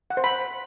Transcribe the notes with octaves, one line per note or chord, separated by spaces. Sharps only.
F#5
C5
B5